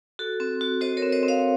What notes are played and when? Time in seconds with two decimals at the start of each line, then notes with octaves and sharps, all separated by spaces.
0.19 F#4 A4
0.40 C4
0.61 F#4
0.81 F#4 C5 D#5
0.97 A#4 C#5
1.02 C4
1.12 C5 D#5
1.23 C4
1.28 C#5 F5